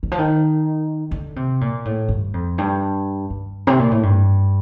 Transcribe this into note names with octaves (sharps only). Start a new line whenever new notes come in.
D#3
F3
D#3
D3
C3
A#2
A2
G2
F2
G2
G2
C3
A#2
A2
G2